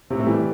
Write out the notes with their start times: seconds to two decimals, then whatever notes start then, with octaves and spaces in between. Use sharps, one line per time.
0.10 A2 C3
0.20 A3
0.26 E3 G3